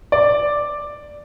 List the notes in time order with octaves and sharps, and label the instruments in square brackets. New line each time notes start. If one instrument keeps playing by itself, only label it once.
[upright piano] D5